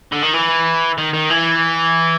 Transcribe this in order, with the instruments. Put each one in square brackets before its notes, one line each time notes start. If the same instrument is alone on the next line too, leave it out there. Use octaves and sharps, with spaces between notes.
[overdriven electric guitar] D3
D#3
E3
D#3
D#3
E3